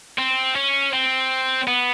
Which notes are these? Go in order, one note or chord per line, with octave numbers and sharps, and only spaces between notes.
C4
C#4
C4
B3